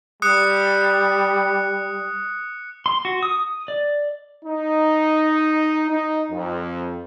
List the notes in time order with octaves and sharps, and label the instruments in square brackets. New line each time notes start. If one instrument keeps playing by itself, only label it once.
[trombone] G3 [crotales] D#6 F#6 C#7
[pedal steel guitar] C6
F#4
D#6
D5
[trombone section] D#4
D#4
F2